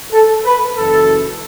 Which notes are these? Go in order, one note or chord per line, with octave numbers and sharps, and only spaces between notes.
A4
B4
F#1 F#2 E3 A4